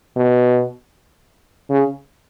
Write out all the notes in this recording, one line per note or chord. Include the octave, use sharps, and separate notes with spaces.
B2
C#3